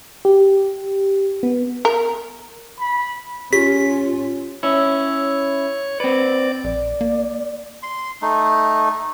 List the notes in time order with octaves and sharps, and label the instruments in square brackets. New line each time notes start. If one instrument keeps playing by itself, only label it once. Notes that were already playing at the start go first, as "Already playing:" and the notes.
[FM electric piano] G4
B3
[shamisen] A#4
[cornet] B5
[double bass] C#4 [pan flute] F4 [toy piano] G4 [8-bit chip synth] B6
[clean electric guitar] C#4 E4 [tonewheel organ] C#5
[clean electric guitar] C4 B4 [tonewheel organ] D5
[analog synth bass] A#1 [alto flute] D5
[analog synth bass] A#3
[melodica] C6
A3 D#4